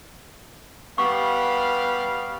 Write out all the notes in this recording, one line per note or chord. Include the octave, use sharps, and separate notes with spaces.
G3 B3 F5 C#6